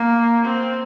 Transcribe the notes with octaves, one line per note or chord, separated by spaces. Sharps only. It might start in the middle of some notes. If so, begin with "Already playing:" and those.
Already playing: A#3
C4